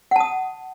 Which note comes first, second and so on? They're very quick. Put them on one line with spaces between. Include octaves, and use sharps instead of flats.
F#5 A5 D#6